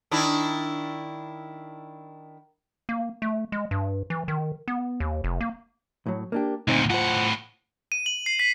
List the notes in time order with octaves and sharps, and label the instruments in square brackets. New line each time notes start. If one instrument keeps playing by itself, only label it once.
[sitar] D#3 D4 E4
[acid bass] A#3
A3
G#3
G2
E3
D#3
B3
D#2
F1
A#3
[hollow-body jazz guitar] A2 F#3
A#3 D4 G4
[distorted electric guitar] D2 A#2 [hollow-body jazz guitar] C4 D#4
[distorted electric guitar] A2 F#5 [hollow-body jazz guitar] F4 C5
[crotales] D#7
F#7
C7
B6